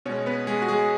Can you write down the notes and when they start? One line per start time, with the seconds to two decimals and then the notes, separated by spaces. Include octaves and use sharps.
0.05 B2 G#3 C#4 C#5
0.26 B3 B4
0.47 G#3 G#4
0.62 F#4
0.68 G#3 G#4